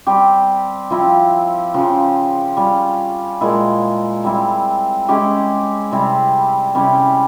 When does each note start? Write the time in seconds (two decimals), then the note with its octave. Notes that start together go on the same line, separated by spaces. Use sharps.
0.07 G3 C4 G4
0.90 F3 C4 E4
1.74 C#3 F3 C4
2.57 G3 C#4 F4
3.41 A#2 G#3 E4
4.24 G3 C4 E4
5.08 G#3 C#4 E4 G4
5.92 C3 G3 C4 E4
6.75 C3 G3 C#4 E4